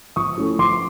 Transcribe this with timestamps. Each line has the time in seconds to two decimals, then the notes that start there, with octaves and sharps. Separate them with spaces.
0.16 F3 C#6 D#6
0.38 A3 C#4 E4
0.59 F3 C6 D6